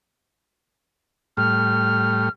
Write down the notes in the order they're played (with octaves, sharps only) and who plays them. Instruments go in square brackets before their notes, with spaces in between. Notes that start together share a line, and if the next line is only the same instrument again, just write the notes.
[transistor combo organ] A2 G3 [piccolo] F6